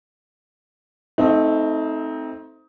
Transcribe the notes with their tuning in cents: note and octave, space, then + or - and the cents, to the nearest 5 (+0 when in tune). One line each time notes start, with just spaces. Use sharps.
A3 -10 C4 +0 D#4 +20